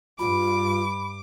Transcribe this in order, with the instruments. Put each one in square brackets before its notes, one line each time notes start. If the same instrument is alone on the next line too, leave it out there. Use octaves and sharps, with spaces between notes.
[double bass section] G2 [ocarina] F4 [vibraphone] B5 [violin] D6